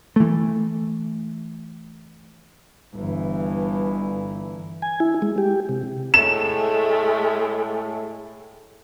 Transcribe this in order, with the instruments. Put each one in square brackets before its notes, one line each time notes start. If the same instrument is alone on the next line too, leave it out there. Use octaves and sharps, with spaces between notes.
[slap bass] E3 A3
[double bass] G1 E3
[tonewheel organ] G#5
E4
G#3
G4
C3
[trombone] A2 [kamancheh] G#3 A3 [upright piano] E7